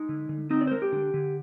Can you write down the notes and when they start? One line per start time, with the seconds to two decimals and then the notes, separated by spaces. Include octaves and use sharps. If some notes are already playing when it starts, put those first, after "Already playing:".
Already playing: G#3 D#4
0.09 D3
0.29 D3
0.50 C4 D#4
0.61 D5
0.67 C5
0.71 G#3 A#4
0.82 G4
0.92 D3
1.14 D3